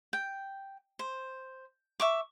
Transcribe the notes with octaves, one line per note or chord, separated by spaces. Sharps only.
G5
C5
E5 C#6 D6